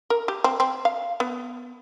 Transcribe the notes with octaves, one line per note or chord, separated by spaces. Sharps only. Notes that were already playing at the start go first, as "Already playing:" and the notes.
A#4
G4
C4
C4
F5
B3